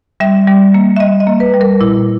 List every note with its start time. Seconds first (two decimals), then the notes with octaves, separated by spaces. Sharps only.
0.20 G3 E5
0.48 G3
0.74 A#3
0.96 E5
1.00 G3 D#5
1.20 D#5
1.27 A#3
1.40 B4
1.54 G3
1.61 A#4
1.81 A#2 E4